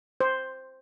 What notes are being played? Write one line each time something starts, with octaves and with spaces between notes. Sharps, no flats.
C5